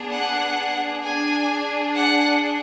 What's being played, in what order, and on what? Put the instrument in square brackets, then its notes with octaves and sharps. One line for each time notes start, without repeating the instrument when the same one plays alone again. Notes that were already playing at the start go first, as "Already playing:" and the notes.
Already playing: [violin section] B3 D4 G#4
F#5
D4 G#4 G#5
F#5